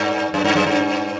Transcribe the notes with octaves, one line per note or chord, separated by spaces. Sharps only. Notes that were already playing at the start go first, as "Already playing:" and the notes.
Already playing: G2
F#2
G2
F#2
G2